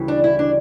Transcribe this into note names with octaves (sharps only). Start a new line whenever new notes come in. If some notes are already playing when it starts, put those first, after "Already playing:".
Already playing: D2 C#3 E3 G3
D4
E4
D4